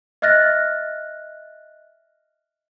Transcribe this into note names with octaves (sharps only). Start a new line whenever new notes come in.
D#5 E5 F6 F#6 A6 A#6